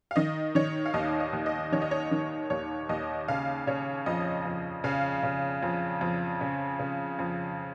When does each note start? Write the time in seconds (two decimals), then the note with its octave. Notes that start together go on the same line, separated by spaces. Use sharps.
0.11 F5
0.16 D#3 D#5
0.55 D#3 C#5
0.86 F5
0.94 D#2 D#5
1.20 D#5
1.33 D#2
1.46 D#5
1.72 D#3 C#5
1.82 D#5
1.91 C#5
2.11 D#3
2.50 D#2 C#5
2.89 D#2 D#5
3.28 C#3 F5
3.67 C#3 C#5
4.06 F2 D#5
4.45 F2
4.84 C#3 F5
5.23 C#3
5.63 F2
6.01 F2
6.41 C#3
6.79 C#3
7.19 F2